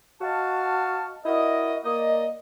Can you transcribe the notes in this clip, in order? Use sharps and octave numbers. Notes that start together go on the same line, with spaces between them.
F#4 D#5 F5 A5
E4 F#4 A#4 D5 D#5
A#3 D5 D#5